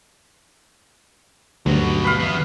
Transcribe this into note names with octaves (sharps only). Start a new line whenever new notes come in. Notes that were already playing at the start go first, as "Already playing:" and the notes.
D2 G2 B2 F#3
B4 F5
E3 B3